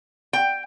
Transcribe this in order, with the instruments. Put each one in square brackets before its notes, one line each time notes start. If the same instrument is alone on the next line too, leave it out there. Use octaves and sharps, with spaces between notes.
[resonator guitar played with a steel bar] G5